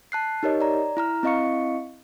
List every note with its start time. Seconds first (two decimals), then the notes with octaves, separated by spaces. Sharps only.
0.12 A5 F#6 C7
0.43 D#4 G4 A#4 C#5 D#5
0.61 D5 A#5
0.97 E4 A#5 F6
1.23 C4 E4 D#5 F5 C#6 C#7